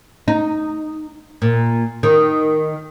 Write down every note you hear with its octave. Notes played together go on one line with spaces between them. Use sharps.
D#4
A#2
D#3